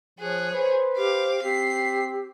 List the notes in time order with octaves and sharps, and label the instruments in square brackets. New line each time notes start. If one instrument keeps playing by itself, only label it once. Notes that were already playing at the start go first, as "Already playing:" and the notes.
[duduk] F3 [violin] G#4 C#5 [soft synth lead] F#6
[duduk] B4 [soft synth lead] C5
[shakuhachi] G4 [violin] F5 D6
[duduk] C4 [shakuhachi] G4 [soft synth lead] B6 [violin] C7